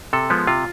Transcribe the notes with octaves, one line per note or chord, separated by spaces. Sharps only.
C3 A4
F3 G#3 B3
C3 F4